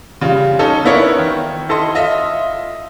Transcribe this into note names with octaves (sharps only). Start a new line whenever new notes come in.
C#3 G3 F4
C#4 D#4 A4
B3 D4 E4 F4 A#4 C#5
D#3
E4 A4 D#5 C6
F4 D#5 E5